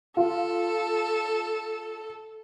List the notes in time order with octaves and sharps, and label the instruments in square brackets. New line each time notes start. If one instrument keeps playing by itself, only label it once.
[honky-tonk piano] F4 [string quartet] A4